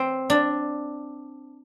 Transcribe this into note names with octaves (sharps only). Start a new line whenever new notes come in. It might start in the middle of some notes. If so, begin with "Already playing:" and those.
Already playing: C4
D4